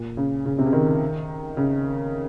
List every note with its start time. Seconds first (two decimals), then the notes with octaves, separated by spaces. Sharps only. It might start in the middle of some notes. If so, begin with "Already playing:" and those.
Already playing: A#2
0.17 C#3
0.46 C#3
0.59 C3
0.66 C#3
0.73 D#3
1.57 C#3